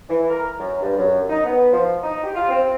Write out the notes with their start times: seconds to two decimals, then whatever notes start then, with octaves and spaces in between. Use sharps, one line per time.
0.09 E3
0.30 A#4
0.59 F#2
0.81 G2
0.97 F#2
1.30 D#4
1.45 B3
1.72 F3
2.03 D#4
2.24 G4
2.35 F4
2.49 C4